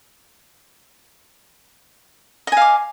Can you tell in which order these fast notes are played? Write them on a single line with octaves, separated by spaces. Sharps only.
D#5 G#5 F5 D6